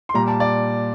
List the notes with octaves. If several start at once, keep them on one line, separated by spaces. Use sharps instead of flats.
C6
A#2 G3 A#5
A5
D5